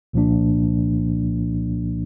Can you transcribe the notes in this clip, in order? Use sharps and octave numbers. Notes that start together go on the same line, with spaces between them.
C2 A#2 F3 A#3 D4